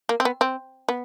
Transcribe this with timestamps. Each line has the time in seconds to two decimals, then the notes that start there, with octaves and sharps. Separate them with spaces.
0.09 A#3
0.20 C4
0.25 B3
0.41 C4
0.89 B3